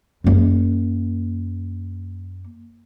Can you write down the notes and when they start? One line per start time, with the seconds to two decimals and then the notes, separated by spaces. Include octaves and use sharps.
0.24 F#2 A#3